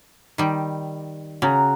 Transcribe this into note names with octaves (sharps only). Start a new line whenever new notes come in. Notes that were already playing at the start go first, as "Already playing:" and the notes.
D#3 G3
C#3 F#4 A#5